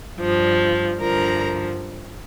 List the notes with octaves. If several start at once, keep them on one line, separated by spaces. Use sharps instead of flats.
G2 F3
G2 D3 F3 A#4 A#5